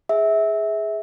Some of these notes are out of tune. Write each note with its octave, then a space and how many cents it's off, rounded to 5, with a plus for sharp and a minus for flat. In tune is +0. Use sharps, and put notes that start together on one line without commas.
G#4 +0 E5 -20